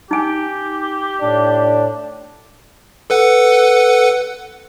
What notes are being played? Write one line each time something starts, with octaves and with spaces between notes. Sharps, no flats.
D#4 G4 G#5
A2 D4
A4 B4 F#5